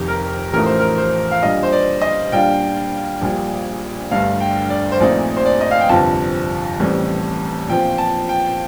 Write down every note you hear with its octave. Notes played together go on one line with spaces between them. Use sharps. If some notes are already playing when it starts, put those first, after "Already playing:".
Already playing: F1 F2 D#3 G4
A#4
A1 A2 F3 A3 D#4 A#4
C5
A#4
C5
F5
A#2 G3 D4 F4 D#5
C5
D5
D#5
A#2 G3 D4 F4 G5
A#1 A#2 G3
G1 G2 D3 A3 D4 F5
G5
D5
C5
A#1 A#2 A3 C4 D#4 D5
C5
D5
D#5
F5
G5
G1 F2 C3 F3 A5
A1 A2 G3 C4
A#2 F3 C4 G5
A5
G5